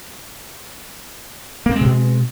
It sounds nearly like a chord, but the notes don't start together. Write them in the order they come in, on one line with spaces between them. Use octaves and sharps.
A#3 C4 G#3 B2